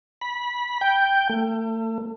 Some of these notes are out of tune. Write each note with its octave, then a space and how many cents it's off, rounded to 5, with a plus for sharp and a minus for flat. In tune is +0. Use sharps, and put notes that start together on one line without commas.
B5 -20
G5 +0
A3 +35